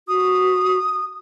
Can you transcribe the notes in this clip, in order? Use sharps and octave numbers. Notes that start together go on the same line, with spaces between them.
F#4 D#6